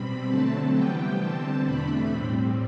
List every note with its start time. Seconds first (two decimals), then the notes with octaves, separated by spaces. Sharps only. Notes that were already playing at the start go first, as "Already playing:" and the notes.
Already playing: B2 G3 C4 B5
0.28 D3 F#3 A3 C4 A5
0.73 C3 E3 G3 B3 G5
1.18 D3 G3 C4 A5
1.62 E2 B2 A3 D4 B5
2.08 A2 G3 C4